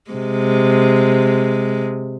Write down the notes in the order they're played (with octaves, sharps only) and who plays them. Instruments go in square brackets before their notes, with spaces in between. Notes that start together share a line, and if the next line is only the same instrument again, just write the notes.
[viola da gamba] C3 G#3